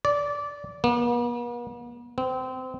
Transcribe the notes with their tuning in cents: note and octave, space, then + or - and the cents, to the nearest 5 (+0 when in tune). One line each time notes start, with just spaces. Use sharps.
D5 -20
B3 -45
C4 -25